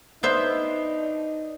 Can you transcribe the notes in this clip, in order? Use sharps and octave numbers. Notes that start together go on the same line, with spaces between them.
B3 D4 D#4 C5 E5